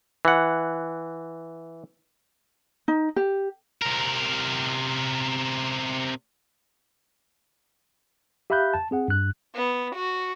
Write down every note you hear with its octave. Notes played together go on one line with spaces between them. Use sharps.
E3 F#5
D#4
G4
C3 A#4
G4 E5 F5 B5 F#6 G6
A5
C4 G#4 F#5
G2 F#6
B3
F#4